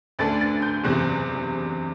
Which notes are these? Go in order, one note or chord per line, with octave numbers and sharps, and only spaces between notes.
D2 D3 A3 D4 A6
A6
G6
F#1 E2 C3 F#6